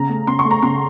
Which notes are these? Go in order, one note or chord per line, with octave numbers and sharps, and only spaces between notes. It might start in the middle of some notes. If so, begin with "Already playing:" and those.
Already playing: C#3 A#5
A3
C#3 C6
C#6
A3
A#5
C#3 C6